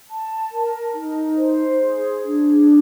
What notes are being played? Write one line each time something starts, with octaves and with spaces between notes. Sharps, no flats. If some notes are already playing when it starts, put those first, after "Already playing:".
A5
A#4
D#4
C5
G#4
D4